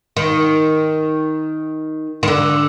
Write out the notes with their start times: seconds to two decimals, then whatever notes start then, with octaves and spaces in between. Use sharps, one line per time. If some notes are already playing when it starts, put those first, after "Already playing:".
0.17 D#3
2.23 D#3
2.28 D3